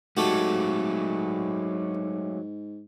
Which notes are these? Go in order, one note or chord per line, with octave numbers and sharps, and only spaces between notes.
G#2 F#3 A3 F#4 G4 A4